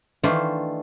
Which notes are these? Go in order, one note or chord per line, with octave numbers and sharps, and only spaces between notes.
D#3 E3 A3 D4 F4 C5